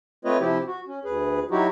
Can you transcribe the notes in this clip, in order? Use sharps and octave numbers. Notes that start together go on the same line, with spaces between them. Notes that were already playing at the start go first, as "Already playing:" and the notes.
A3 C4 F4 B4 C#5 D#5
C3 F3 E4 G4
F#4
C#4
D2 G#4 B4
F#3 D#4 E4 F#4 G4